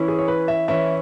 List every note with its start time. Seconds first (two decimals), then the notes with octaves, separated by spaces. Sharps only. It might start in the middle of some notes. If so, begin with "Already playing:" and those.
Already playing: E3 C#4 E4
0.08 G#4
0.19 C#5
0.28 B4
0.48 E5
0.68 E3 C#4 E4 E5